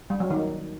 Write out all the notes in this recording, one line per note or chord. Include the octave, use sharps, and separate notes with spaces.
G3
F#3
D#3